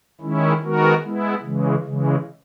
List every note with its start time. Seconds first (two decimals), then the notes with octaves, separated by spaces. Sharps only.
0.21 D#3 G#3 C#4 E4
0.62 D#3 G#3 B3 F#4 A#4
1.03 G#3 B3 E4
1.43 C#3 E3 G#3
1.83 C#3 E3 G#3